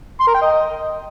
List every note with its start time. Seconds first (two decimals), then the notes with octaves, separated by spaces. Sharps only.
0.20 C6
0.27 A#4
0.34 G5
0.41 D#5